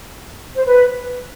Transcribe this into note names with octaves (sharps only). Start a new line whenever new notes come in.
C5
B4